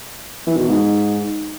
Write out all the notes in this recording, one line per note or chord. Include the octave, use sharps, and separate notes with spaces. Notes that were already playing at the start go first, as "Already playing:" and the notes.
E3
B2
G#2